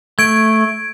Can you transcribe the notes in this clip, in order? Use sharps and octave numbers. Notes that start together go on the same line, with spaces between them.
A3 G#6 D7